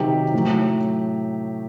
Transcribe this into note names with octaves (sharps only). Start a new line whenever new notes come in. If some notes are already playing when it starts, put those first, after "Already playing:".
Already playing: C3 D#3 F#3 G4
A2 F#3